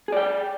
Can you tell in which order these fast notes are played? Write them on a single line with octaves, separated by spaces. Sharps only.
G#4 D5 G5